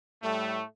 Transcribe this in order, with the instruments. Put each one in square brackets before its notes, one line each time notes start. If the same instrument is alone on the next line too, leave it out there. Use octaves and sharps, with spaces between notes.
[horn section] A2 G3 A3